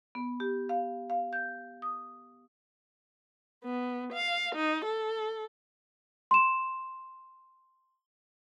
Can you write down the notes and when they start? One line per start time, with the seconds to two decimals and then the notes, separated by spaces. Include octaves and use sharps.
0.15 B3
0.40 G4
0.69 F5
1.10 F5
1.33 G6
1.82 D#6
3.64 B3
4.13 F5
4.56 D#4
4.85 A4
6.31 C6 E7